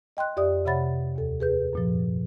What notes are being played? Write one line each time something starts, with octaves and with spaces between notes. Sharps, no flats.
D#5 G5 C6 F#6
F2 G4 D5 E5 D#6
C3 C#5 E5 F#5 B5 A6
D#2 A4
G#4 B4 G6
F#2 A#2 F3